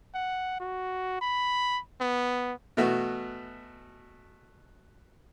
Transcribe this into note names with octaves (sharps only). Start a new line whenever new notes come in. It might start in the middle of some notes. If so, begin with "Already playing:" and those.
F#5
F#4
B5
B3
B2 E3 A3 F#4